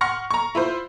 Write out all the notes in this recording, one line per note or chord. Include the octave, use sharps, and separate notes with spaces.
F#5 C6 C#6 F6 A#6 C#7
A#5 C#6
E4 F4 C5